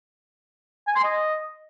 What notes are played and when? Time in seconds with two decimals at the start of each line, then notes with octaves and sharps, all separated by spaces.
0.87 G#5
0.95 C6
1.04 D#5